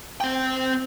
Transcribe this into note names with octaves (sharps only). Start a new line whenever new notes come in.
C4 G5